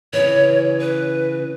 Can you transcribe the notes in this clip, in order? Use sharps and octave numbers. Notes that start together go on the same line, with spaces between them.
C#3 E3 C#5
B4